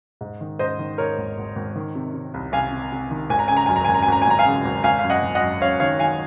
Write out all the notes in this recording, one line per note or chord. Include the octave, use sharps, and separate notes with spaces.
G#2
D#3
G#2 C5 D#5
D#3
G#2 A#4 C#5
G#1
G#1
G#1
D#3
C3
C3
C2
C2 F5 G#5
C3
C3
D#3
G#1 G#5
A#5
C#3 G#5
A#5
F#2 G#5
A#5
G#1 G#5
A#5
G#5
G#1 A#5
G#5
G#1 A#5
F5 G#5
C#3
G#1
G#1 F5 G#5
F#2 F5
D#5 F#5
G#1
D#5 F#5
F#2
F#2 C#5 F5
D#3 C#5 F5
D#3 F5 G#5